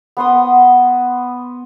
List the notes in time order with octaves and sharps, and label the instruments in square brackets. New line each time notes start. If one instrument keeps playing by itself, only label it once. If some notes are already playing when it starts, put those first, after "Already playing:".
[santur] B3 C6 D#6